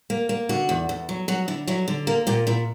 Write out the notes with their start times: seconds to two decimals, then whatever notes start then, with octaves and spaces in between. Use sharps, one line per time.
0.10 A#3
0.29 A#3
0.49 D3 F#4
0.69 E2
0.89 E2
1.09 F#3
1.28 F#3 F#4
1.48 D3 E4
1.67 F#3 E4
1.88 D3
2.07 A#3 A#4
2.27 A#2 G4
2.47 A#2 E4